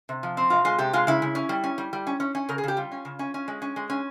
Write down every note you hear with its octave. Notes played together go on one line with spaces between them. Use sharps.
C3
F3
C4
C3 F4
G#3 F4
C3 G4
G#3 F4
C#3 E4
C#3
C#4
G3
C#4
G3
G3
C#4
C#4
C#4
C#3 A#4
G#4
C#3 G4
G3 F4
C#4
C#3
C#4
C#4
G#3
C#4
G#3
C#4